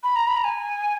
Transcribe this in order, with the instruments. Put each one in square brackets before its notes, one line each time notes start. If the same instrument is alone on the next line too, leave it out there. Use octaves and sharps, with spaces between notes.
[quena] B5
A#5
B5
A#5
G#5